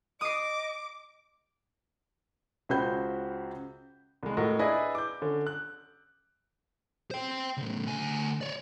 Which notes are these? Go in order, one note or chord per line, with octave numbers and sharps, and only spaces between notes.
D#5 D6 D#6 C7
C#2 C#3 F#4 C5 B5 G6
C2 G#3
A2 F#4 A#4 D#5
D4 E4 G#4 B4 D5 D#5
D6 G6
D3 C#4
F#6
C5 G5
A2 C#3
D2 G#5
C#5 D5